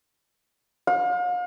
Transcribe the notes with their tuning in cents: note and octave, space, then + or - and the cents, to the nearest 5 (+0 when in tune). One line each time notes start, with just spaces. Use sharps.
F5 +40